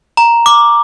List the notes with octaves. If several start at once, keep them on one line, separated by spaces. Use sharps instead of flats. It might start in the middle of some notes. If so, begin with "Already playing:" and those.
A#5
D6